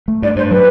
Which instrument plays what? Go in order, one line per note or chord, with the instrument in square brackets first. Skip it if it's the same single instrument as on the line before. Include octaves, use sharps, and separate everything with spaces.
[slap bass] A3
[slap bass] G2 [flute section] D5
[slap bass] G2 [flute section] C5
[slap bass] F#3 [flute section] B4